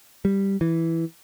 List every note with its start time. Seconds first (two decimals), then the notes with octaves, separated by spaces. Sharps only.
0.25 G3
0.61 E3